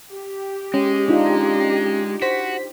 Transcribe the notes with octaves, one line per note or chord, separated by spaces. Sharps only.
G4
G#3 C#4
D4 D#4 F4
F#4 C5 B6